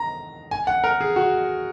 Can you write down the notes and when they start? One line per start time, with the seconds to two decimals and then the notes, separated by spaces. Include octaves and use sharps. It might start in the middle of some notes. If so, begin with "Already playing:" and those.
Already playing: A#5
0.51 G#5
0.67 F#5
0.84 A#4
1.01 G#4
1.16 F#4